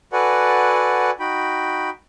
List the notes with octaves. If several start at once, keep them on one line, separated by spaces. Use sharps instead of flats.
F#4 A4 B4 D5 F#5 G#5
D#4 F#4 G5 B5